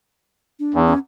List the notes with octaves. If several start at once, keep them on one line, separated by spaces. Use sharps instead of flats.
D4
E2
C#4